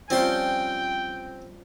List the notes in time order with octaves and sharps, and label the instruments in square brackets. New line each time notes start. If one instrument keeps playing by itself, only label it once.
[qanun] F3 G3 C#4 [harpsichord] C4 C6 [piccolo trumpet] G5